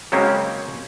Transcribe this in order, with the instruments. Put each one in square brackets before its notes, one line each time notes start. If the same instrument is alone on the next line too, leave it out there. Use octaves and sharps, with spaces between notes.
[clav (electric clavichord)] C#3 F#3 G#3 A#3 C4 C#4